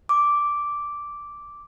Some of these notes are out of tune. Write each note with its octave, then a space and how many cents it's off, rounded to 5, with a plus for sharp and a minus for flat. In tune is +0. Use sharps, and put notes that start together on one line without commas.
D6 -5